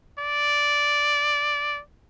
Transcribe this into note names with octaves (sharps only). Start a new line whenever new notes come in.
D5